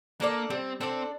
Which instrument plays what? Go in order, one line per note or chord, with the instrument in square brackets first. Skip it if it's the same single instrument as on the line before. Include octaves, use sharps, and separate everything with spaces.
[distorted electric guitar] A#3 [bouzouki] D4 A4 D5
[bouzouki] G3 [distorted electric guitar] C4
[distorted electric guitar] C4 [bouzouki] D4 A4 D5